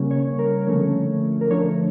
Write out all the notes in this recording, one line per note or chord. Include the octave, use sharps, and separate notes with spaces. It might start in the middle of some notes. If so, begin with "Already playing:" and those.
Already playing: C#3 G3 A#3 C#4
C#5
A#4
D3 F3 A3 C#4 C#5
A#4
D3 F3 A3 D4 C#5